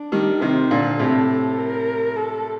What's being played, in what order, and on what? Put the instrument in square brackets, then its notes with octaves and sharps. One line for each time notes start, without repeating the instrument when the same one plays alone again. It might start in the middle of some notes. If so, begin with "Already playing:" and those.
Already playing: [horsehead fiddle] D4
[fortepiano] D#3 G3
[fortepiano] C3 D#3 [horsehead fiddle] C5
[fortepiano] A#2 D3
[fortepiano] A2 C3 [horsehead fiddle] A4
[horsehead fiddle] A#4
A4